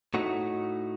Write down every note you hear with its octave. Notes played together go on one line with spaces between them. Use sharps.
A2 A3 D#4 F#4